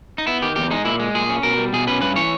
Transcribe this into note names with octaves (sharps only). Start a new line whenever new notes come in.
D#4
B3 E4
D#3 G4
E2 G4
G#3 D#4
A#2 E4
G#3
A#2 G#4
C#4
B2 A#4
G3
B2 G#4
C#4 B4
G2 B4
E3 C#5